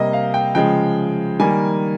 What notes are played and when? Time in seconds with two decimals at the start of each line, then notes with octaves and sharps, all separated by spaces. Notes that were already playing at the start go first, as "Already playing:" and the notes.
Already playing: C3 G3 A#3 D#5
0.13 F5
0.34 G5
0.55 C#3 F3 G#3 G5
1.40 D#3 G3 A#3 G#5